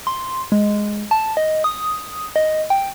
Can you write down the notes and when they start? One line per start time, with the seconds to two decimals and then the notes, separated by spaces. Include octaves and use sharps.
0.07 C6
0.52 G#3
1.11 A5
1.37 D#5
1.64 D#6
2.36 D#5
2.70 G5